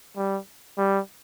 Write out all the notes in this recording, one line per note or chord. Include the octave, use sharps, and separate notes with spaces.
G3
G3